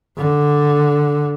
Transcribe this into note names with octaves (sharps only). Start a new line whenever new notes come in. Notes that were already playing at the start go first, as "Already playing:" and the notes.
D3